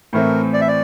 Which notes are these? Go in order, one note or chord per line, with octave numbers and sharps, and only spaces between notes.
A2 E3 A3 C4 E4 A#4
D5
E5
D5